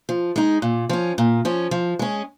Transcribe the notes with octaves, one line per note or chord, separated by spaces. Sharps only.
F3
G#3 D#4
A#2
F3 C#4
A#2
F3 C#4
F3
G#3 C#4